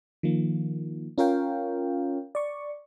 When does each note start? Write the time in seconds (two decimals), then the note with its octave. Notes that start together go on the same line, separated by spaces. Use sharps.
0.23 D#3 F3 A#3
1.18 C#4 F4 A#4 C#5 F5 G5
2.35 D5 C#6